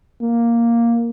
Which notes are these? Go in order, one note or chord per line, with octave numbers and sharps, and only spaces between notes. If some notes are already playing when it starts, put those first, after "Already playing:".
A#3